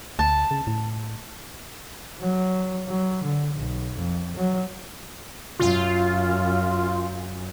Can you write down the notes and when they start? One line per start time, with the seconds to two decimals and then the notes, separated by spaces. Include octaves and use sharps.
0.19 D2 A5
0.51 C#3
0.67 A2
2.20 F#3
2.87 F#3
3.23 D3
3.55 B1
3.96 F2
4.36 F#3
5.59 F#2 F4